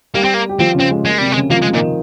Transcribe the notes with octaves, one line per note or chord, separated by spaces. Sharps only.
G3 A#3 G4
C4
A#3
G4
F3 C4 F4
C#3 C#4
C4
G#3
G#3 A#3
C3 G3 C4
G#3
C#3 C#4
F3 A#3 F4
G#3
A#2 D#3 D#4